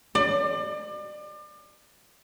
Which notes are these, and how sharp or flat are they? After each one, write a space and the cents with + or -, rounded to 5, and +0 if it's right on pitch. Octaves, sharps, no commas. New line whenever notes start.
D5 +35